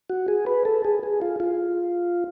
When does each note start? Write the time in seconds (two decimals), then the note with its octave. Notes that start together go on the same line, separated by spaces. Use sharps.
0.10 F#4
0.28 G#4
0.47 B4
0.65 A4
0.85 G#4
1.03 G#4
1.22 F4
1.40 F4